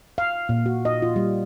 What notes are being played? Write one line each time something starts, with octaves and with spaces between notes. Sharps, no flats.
F5
A#2
F#4
D#5
F4
G3